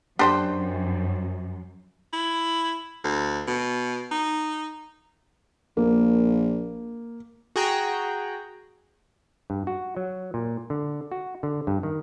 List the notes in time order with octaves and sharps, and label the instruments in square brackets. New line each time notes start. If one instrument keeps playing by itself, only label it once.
[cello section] F#2 [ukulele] D4 [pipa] G4 C5 G5
[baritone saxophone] E4
D2
B2
D#4
[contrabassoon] A#1 [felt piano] A#3
[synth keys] F#4 G#4 G5 A#5 F#6
[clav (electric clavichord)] G2
F#4
F#3
A#2
D3
F#4
D3
G2
D#3